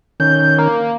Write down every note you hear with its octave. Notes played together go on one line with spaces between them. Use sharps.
D#3 C#4 G6
A#3